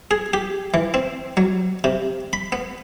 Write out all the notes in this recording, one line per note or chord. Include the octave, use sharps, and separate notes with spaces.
G#4
G4
E3
C4
F#3
C3
B5
B3